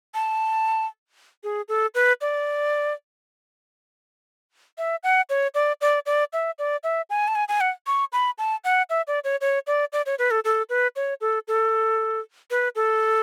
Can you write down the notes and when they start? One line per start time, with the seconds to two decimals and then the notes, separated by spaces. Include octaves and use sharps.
0.14 A5
1.44 G#4
1.69 A4
1.95 B4
2.21 D5
4.78 E5
5.03 F#5
5.30 C#5
5.55 D5
5.81 D5
6.06 D5
6.33 E5
6.59 D5
6.84 E5
7.10 G#5
7.28 A5
7.35 G#5
7.48 G#5
7.61 F#5
7.87 C#6
8.13 B5
8.38 A5
8.64 F#5
8.90 E5
9.07 D5
9.24 C#5
9.41 C#5
9.67 D5
9.93 D5
10.06 C#5
10.19 B4
10.31 A4
10.45 A4
10.69 B4
10.96 C#5
11.21 A4
11.48 A4
12.51 B4
12.75 A4